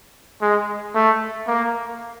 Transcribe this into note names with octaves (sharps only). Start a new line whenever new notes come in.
G#3
A3
A#3